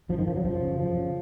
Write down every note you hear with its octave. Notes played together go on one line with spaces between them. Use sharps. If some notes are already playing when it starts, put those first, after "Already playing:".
F#2 F3
D#3
C#3 F3
F#3
F#2 F3
C#3
F#2 F3
C#3